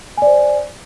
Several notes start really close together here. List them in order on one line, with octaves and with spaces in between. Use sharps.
G#5 D5 C5